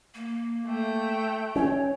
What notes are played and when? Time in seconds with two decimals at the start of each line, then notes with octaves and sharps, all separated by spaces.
0.15 A#3
0.67 A3 G5
1.56 C#4 C#5